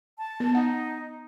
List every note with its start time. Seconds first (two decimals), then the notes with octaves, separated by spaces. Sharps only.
0.18 A5
0.40 B3
0.55 D#4 F#5